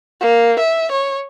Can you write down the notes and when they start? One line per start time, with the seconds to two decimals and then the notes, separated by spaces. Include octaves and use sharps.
0.21 A#3
0.59 E5
0.92 C#5